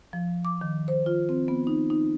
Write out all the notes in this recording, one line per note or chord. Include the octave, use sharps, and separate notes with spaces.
F3
D6
D#3
C5
F4
C4
B3
D#4
D#4